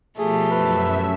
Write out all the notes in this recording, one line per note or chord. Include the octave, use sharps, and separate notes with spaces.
B2 F3 A3 G4 G#4
F#2 B4 E5